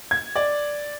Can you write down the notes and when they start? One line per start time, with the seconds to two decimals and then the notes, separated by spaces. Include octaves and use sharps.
0.11 G#6
0.36 D5